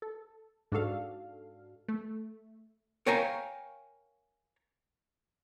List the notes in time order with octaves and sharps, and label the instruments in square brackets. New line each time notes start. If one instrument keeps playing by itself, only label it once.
[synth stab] A4
G#2 D4 F#4 A4 F5
A3
[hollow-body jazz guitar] A#4 C#5 F5 G5 G#5 A#5